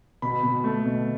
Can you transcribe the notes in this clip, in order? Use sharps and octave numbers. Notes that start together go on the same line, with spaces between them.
B2 B5
B2
A3
B2